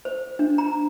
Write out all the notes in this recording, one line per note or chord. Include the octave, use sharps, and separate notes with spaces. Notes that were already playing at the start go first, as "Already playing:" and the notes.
C5
D4
A#5